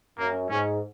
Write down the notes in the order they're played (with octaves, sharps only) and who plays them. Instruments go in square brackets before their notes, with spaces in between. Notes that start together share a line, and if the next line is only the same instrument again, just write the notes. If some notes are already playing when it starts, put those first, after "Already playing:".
[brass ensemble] F#2 [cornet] A#3
[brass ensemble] G#2 [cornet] C#4